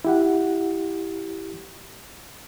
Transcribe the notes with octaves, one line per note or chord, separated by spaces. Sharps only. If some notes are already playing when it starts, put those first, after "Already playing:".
E4 G4 F#5